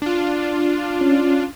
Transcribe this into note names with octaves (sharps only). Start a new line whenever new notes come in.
D4 F4
C#4